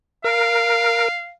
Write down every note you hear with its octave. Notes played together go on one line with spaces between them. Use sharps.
A#4 F5